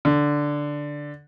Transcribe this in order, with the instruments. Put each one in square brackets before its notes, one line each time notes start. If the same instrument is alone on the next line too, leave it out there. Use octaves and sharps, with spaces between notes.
[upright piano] D3